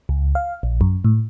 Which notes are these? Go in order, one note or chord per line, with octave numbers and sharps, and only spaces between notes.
C#2
F5
A#1
F#2
A2